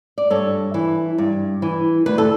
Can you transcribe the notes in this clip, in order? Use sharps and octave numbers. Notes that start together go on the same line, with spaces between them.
D5
G2 A4 C#5
E3
G2
E3
D2 B4
A4